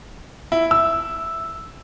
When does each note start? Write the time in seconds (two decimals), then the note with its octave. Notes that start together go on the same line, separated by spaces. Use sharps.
0.52 E4
0.71 E6